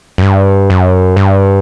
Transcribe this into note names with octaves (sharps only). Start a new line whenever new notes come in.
F#2
G2
F#2
G2